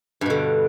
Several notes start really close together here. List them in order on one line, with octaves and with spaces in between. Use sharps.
G2 B2 D3